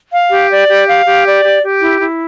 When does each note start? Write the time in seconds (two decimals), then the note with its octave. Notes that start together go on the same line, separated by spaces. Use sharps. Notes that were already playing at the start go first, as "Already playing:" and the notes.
0.12 F5
0.31 G4
0.49 D5
0.68 G4
0.88 F5
1.06 G4
1.26 D5
1.44 G4
1.63 G4
1.81 E4
2.00 E4